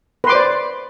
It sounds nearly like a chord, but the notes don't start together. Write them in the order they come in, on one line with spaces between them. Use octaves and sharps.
B4 C6 D6 C5 D5